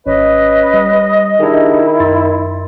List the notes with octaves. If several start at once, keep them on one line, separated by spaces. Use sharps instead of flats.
G#1 C#4 B4 D#5
G3
D#3 D4 E4 G4 G#4
F#2 C6 A6